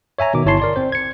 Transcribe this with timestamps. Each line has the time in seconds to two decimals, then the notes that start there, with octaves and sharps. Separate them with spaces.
0.19 C#5 E5 G#5 A#5
0.34 B2 D#3 D6
0.46 G1 E4 C#5 A5 C6 C7
0.60 A#4 D5 C6
0.76 C4 C5
0.92 G#6 C#7